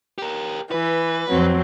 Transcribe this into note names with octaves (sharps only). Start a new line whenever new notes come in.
G4 A#4
E3 B4
F2 F#3 C4